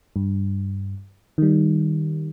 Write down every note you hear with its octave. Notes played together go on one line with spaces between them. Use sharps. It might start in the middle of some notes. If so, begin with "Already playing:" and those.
G2
D#3 G3